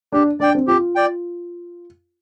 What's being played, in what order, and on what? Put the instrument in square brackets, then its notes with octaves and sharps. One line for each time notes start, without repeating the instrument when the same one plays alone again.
[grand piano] D4 [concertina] G4
[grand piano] D4 [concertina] D5 G5
[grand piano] C4
[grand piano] F4 [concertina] G4
[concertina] D5 G5